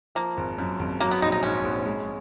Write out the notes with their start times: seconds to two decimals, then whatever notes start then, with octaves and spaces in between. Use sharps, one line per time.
0.15 F3 A#3
0.37 G#1
0.58 F#2
0.79 G#1
1.00 F#3 A#3
1.11 B3
1.22 A#1 D#4
1.32 D#4
1.43 G#2 C#4
1.64 A#1
1.85 G#3